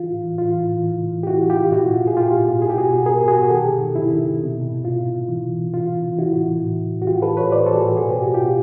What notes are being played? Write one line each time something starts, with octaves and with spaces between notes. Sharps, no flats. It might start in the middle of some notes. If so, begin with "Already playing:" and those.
Already playing: E3 F4
A2
E3
A2 F4
E3
A2
E3
C3
E3
G4
C3 E4 F#4
E3
F4 G4
C3
A#2 E4 F#4
A#2
F4
A#2
G#4
A#2 F4 G4
A#2
A#2
B2 G#4
G4
B2 F#4 G#4
B2
B2 G#4 A#4
B2
F#4 G#4
B2
D#3 G4 A4
C3
D#3
C3 E4
D#3
C3
B2
B2
B2
B2 F4
B2
B2
E3
C3
E3
C3 F4
E3
C3
E3 E4 F#4
A2
E3
A2
E3
A2
F#4
E3 F4 G4
A2 A4 B4
E3 B4 C#5
A2 C5 D5
E3 A4
F#4 G#4
A2
B2 G#4
B2 G4
B2 F#4
F4 G4
B2